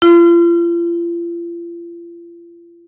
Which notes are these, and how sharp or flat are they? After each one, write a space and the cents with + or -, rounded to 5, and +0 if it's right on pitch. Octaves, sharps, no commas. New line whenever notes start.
F4 -40